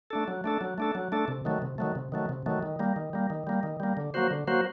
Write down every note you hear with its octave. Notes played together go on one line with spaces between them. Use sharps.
A3 D4 A4
F#3
A3 D4 A4
F#3
A3 D4 A4
F#3
A3 D4 A4
C3
D#3 F#3 A3
C3
D#3 F#3 A3
C3
D#3 F#3 A3
C3
D#3 F#3 A3
D#3
G3 A#3
D#3
G3 A#3
D#3
G3 A#3
D#3
G3 A#3
D3
F#3 A#3 F#4 C5
D3
F#3 A#3 F#4 C5